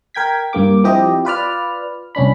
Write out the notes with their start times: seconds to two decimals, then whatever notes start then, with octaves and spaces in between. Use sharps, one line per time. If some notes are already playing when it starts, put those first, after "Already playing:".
0.14 A#4 G5 G#6 B6
0.53 G2 A#3 D6
0.84 F3 C4 E4 G4 D#5
1.25 F4 B4 D5 F6
2.15 C2 C#4 D4 B5